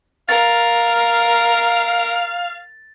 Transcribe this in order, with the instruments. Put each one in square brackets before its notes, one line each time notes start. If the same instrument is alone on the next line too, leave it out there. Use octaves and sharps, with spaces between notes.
[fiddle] A#4 [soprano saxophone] F5 [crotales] A6